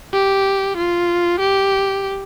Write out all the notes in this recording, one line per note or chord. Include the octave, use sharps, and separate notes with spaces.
G4
F4
G4